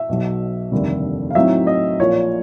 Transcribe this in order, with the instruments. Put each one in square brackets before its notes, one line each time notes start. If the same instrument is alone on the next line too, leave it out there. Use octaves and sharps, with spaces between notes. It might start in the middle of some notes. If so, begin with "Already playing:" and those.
Already playing: [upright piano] E5
B1 B2 F#3
F1 D#2 D3 G3
F5
A2 F#3 A3 C4 D#4 E5
D#5
A#1 A#2 F3 C#5